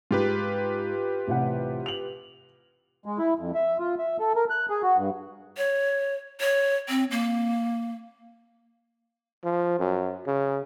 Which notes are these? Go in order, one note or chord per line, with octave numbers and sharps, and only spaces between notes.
G#2 F4 G4 B4
A1 C3 F#5
F7 F#7
G#3
E4
F2
E5
F4
E5
A4
A#4
F#6
G#4
F#4
G2
C#5
C#5
C4
A#3
F3
F#2
C#3